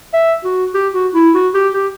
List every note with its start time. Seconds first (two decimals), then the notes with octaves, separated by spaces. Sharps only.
0.13 E5
0.44 F#4
0.74 G4
0.94 F#4
1.15 E4
1.34 F#4
1.54 G4
1.74 G4